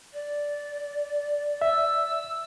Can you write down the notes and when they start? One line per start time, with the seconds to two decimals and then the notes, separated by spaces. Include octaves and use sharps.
0.14 D5
1.61 E5 E6